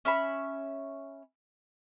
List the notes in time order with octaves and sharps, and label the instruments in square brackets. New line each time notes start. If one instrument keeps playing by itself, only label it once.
[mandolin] C#4 E5 B5